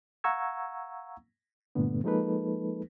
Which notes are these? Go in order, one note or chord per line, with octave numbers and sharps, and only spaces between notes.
F5 F#5 A#5 C#6 E6 G#6
G2 A#2 D3 A3 B3
F3 G#3 A#3 D#4 A4 B4